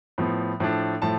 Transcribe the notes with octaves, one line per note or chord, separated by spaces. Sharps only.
A2 F3 B3
A2 F3 A3 D4
A2 F3 A3 A5